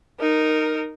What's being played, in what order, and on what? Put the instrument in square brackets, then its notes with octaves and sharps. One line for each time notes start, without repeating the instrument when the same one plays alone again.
[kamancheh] D#4 A#4